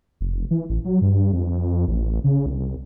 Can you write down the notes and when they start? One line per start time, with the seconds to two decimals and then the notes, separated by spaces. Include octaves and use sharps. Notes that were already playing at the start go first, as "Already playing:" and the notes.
0.21 F1
0.51 E3
0.69 A1
0.85 F#3
1.02 G2
1.33 F2
1.88 A1
2.24 C#3
2.46 C2